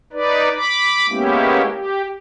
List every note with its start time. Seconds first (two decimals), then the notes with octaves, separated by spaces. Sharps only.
0.13 D#4 B4 D5
0.55 B5 D6
1.09 G#3 A#3 B3 C#4 E4 G4
1.71 G4